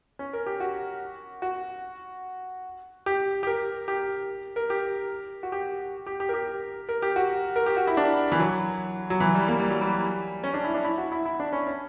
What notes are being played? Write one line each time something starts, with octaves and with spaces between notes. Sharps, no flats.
C#4
A#4
G4
F#4
F#4
G4
G4
A#4
G4
A#4
G4
F#4
G4
G4
G4
A#4
G4
A#4
G4
F#4
A#4
G4
F#4
E4
D4
E3
F#3
F#3
E3
G3
A#3
G3
F#3
G3
C#4
D4
E4
D4
E4
F#4
E4
E4
D4
C#4
C#4